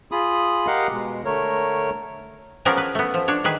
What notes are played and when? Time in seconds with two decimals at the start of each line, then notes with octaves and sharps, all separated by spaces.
0.12 F4 G#4 B5 D#6
0.67 G4 A#4 D#5 F5 F#5
0.91 B2 G#3
1.25 D3 A3 A#4 C#5
2.65 F3 B3 C#4 G#4 A#4 D5
2.77 B4
2.95 A3 B3
3.14 F3
3.28 D4 C#5
3.44 D#3 G#4 B4